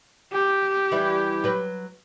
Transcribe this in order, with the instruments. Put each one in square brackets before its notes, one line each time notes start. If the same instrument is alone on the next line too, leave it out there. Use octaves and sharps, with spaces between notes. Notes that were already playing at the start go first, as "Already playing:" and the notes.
[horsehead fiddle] G4
[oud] E3 G3 E4
F#3 B4